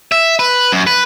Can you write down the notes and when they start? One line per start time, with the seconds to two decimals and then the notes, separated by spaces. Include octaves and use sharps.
0.12 E5
0.39 B4
0.72 F#2
0.87 B4